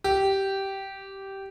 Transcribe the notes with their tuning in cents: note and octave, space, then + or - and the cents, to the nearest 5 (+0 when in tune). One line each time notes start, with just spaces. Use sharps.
G4 -10